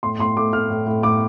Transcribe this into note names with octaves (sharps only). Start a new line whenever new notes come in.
A2 C6
A2 C6
A3 D6
A3 F6
A2
A2
A2 D6